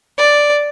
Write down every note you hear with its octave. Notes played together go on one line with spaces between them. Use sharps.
D5